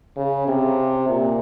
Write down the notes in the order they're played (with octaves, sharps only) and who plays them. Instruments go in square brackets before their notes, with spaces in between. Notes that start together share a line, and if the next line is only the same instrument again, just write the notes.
[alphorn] C#3
C3
A#2